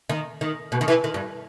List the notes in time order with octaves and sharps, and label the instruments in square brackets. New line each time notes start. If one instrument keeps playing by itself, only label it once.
[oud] D#3
D#3
B2
D#3
E3
D#3
G2